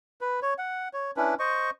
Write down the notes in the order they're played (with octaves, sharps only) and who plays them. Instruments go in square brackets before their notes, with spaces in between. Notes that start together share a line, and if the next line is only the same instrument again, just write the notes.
[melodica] B4
C#5
F#5
C#5
C#4 D4 E4 B4
C5 D#5 C#6